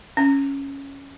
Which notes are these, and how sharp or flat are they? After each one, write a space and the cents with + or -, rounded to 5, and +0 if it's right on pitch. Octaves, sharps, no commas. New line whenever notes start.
C#4 +0